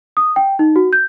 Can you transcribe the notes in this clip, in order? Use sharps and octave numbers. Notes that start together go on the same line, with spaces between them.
D#6
G5
D#4
F#4
G6